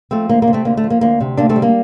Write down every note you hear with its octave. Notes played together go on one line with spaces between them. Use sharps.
F3 A3 C4
D2 A#3
A#3
C3
A3 C4
D2 A#3
A3
F3
A#3
D2 A#3
C3
D2 A#3 D4
A3 C4
G3
A#3